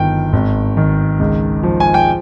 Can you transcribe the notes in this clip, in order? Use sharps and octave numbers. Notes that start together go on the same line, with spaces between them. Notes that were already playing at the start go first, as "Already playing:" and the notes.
Already playing: G1 D#3 F3 G5
G#1
D#3
C#2
F3
G#5
G5